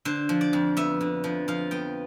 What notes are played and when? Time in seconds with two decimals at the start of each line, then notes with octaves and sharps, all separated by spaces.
0.05 D3 C5
0.29 F3
0.41 D5
0.53 F2
0.77 B3 E5
1.01 D3
1.24 F3
1.48 F3 F5
1.71 B3 G5